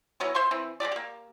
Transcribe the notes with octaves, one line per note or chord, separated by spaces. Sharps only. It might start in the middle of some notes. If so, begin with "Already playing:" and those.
E3 F#3 B3 C#4
C5 E5 C6 C#6
E3 C4
G#3 A3 G4 D5
A#3 G4